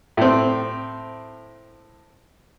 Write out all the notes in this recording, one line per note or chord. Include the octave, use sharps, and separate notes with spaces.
A2 C4